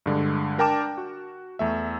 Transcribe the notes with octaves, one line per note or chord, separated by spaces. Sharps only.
G2 D3 G#3
D4 A#4 G5 A5 D6 E7
F#4
E2 A3 E5